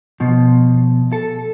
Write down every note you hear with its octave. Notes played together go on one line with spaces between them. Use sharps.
B2 F3
A4